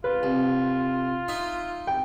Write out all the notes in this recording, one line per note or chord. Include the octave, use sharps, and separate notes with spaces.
F4 B4
C2
D#4 E5
G5